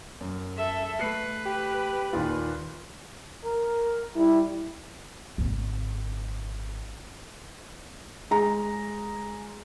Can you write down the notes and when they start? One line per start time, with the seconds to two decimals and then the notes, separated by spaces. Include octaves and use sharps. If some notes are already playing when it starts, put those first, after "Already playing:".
0.21 F#2
0.57 A4 E5
1.00 A3 B4 C7 C#7
1.46 G4
2.13 D#2 A#2 F4
3.45 A#4
4.16 G3 E4
5.38 G#1 D3
8.31 G#3 A#5